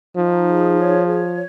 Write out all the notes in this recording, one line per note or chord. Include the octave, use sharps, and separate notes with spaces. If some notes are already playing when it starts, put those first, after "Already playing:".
F3 D#4
G#4
C#5
C#5